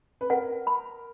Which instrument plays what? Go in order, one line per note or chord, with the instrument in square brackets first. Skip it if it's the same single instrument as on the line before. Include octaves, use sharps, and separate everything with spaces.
[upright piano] B4
[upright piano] A#4 [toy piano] F#5
[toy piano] B5